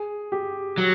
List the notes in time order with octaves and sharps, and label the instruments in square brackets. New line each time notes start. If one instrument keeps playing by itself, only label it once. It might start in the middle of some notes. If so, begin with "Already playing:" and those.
Already playing: [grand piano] G#4
G4
[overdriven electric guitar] F#3